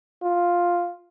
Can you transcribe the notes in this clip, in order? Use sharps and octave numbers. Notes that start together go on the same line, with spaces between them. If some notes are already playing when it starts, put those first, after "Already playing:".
F4